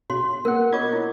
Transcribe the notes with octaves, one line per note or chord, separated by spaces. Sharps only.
B2 F#4 C#5 C6
A#3 B3 A#4 F#5
F4 C#5 D#5 D6 G#6
E4